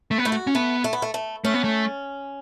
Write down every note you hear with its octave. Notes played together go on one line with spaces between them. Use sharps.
A3
B3
A3 E4
F#4
C#4
A3 B3
A3
B3
A3
A3
A3 C#4
B3
A3